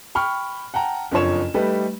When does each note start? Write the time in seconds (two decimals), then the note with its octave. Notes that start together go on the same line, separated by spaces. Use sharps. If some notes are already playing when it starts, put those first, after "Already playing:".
0.15 G5 B5 C#6 F6
0.74 F#5 G5 A5 A#5
1.11 F#1 F2 D4 F4 C#5 E7
1.54 G3 A3 D#4 G4 A4 B4